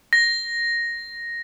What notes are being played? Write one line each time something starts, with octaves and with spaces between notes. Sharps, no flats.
A#6